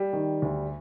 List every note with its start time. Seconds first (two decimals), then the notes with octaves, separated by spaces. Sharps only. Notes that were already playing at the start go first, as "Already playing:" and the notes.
Already playing: G3
0.13 D#3
0.42 D2